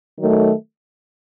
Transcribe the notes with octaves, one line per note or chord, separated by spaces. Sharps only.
D#3 F#3 A3